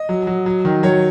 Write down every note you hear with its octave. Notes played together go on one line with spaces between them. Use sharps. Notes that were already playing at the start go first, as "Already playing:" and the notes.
Already playing: D#5
F#3
F#3
F#3
D#3
F#3 C#5